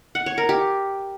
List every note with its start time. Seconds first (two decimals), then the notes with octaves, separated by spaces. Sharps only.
0.15 F#5
0.26 C#5
0.38 A#4
0.49 G4